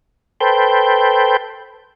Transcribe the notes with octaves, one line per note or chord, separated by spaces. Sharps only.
A4 B4 C5 G5